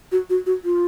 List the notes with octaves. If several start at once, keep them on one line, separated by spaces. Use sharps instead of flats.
F#4
F#4
F#4
F4